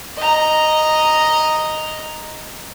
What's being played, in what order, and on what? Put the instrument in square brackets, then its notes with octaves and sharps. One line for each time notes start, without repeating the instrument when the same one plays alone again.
[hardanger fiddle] D#5 A#5